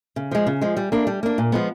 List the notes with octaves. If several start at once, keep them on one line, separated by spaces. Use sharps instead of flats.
C#3
F3 G#3
C#3
F3 G#3
G3
A#3 D4
G3
A#3 D4
A#2
F3 G#3 B3